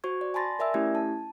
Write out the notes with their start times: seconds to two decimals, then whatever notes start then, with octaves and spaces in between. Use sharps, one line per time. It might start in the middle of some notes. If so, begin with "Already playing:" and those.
0.04 F#4 C5 C#6 G#6
0.21 D5
0.34 G#5 A5 B5 C6 A6 A#6
0.59 A#4 D5 E5 G#5 E6
0.74 A3 C#4 E4 G4 G#6
0.95 A5